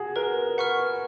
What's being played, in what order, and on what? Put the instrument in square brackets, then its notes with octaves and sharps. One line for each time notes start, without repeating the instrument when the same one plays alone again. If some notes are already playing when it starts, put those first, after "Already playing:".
Already playing: [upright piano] F#4 G#4
[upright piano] A#4 [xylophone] B4
[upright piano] B4 [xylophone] F#5 C#6 F6